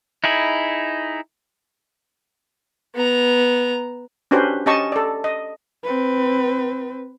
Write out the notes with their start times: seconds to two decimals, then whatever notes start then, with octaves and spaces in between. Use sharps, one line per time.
0.24 D#4 E4 G#4 B5
2.95 B3 A#5
4.31 C#4 D4 F#4 G4 B4 C5
4.66 C#4 G4 D#5 A5 C#6
4.92 A4 D5
5.24 D#5
5.84 C4 B4